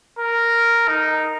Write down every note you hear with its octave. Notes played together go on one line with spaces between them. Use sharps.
A#4
D#4